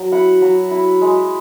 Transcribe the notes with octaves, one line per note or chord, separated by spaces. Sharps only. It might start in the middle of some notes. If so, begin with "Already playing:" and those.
Already playing: F#3
E4 F#5
F#3
E4
G#3